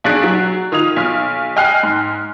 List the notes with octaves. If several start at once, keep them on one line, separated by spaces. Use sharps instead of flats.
B1 D4 G#4 F#6 A6 D7
F#3
D#3 F4 D#6 G#6 F7
B1 F6
D#5 G5 G#5 F6 F#6 C7
G#2